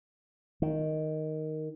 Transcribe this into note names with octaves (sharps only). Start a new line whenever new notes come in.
D#3